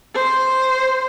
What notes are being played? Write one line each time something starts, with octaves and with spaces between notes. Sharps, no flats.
C5